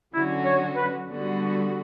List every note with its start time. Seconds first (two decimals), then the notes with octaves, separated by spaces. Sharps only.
0.13 D3 F#3 C#4 E4 F#4
0.45 C#5
0.76 B4
1.07 D3 G3 B3 F#4